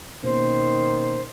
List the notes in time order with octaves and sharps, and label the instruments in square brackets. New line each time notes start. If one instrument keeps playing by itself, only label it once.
[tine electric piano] B2 A#3 C#4 [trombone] D#3 [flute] C5